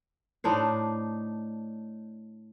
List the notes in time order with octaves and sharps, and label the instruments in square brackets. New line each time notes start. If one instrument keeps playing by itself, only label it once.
[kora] A2 D4 D#4 C5